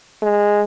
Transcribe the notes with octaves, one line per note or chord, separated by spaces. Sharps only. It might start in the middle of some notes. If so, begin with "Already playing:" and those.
G#3